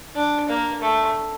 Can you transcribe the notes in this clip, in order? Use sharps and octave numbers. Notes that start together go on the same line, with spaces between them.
D4
A#3
A3